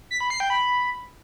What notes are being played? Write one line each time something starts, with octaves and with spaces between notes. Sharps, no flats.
B6
B5
C7
G5
B5